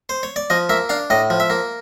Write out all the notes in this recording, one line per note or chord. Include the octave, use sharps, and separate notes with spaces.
C5
C#5
D5
F3 D#5
A#3 E5
D4 F5
A2 D#5
F3
E5
A#3